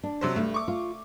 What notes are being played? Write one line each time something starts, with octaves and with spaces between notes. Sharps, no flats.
D4
C3 F#3 C5
G2 A3
C#6 D6
F4